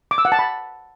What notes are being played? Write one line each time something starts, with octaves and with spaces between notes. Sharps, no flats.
D6
E6
F#5
A5
B5